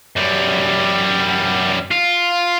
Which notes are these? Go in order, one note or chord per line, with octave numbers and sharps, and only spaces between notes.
F#2 G3
F4